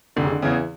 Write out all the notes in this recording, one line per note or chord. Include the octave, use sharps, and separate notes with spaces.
F1 D3
C#3
D3
E2 C#3 E3